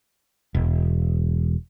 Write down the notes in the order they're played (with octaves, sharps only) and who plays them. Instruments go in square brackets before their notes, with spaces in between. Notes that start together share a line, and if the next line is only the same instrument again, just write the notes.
[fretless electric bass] E1